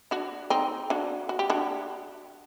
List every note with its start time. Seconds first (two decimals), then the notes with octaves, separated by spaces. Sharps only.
0.11 D4 F#4
0.50 C4 D#4
0.90 D4 F#4
1.29 F#4
1.39 G4
1.50 D4 F#4